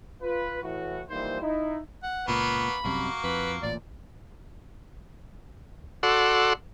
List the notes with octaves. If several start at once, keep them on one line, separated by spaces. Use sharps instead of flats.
F4 B4
A2 E3 F#4
E3 F3 G3 A#3 D#4 C5
D#4 E4
F#5
C#2 A#2 A#3 B3 B5 C#6
C2 F#2 C3 A#3 F#4
F2 B4
A1 A#2 D5
F#4 A4 D5 F#5 C6 E6